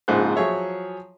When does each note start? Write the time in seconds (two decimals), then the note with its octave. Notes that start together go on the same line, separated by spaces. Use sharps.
0.08 A#1 G#2 C#3 F4 C5 F#6
0.36 F3 F#3 G#4 C#5 E5